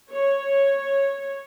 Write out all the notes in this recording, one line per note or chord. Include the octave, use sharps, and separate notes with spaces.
C#5